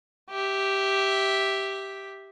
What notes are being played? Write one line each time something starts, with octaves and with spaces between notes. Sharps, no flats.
G4 E5